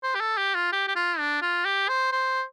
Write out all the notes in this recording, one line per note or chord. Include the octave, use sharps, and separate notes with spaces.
C5
G4
A4
G4
F4
G4
G4
F4
D4
F4
G4
C5
C5